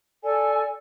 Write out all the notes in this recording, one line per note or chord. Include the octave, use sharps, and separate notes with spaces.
A4 D5 G#5